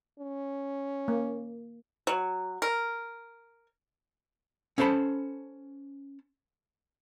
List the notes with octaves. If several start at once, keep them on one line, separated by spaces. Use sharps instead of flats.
C#4
A#3
F#3
A#4
C#4 A4 C5 A5 B5